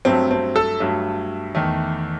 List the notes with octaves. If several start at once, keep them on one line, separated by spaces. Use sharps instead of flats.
G2 F#3 A3 C4
C4
A4
G2 F#3 A3
E2 D#3 A3